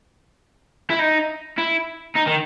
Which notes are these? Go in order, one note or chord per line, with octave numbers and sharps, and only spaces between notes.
E4
D#4
E4
D#4
D#3